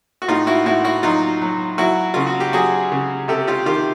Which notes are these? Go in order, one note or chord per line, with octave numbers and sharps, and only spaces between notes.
F#4
A2 D#4 F4
E4 F#4
A2 E4 F#4
E4 F#4
F#3 D#4 F4
F#3
F#3 E4 F#4
C#3 F4
F#4
G4
F#3 F#4 G#4
C#3
C3 G4 A4
F4 G4
D#3 F4 G4